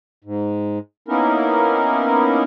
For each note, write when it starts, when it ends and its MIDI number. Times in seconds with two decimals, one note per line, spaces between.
0.24 0.79 44
1.08 2.43 58
1.08 2.43 59
1.08 2.43 61
1.08 2.43 63
1.08 2.43 64
1.08 2.43 70